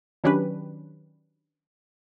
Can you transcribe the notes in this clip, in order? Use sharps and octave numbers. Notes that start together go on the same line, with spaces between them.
D#3 F#3 C#4 D4 G4 B4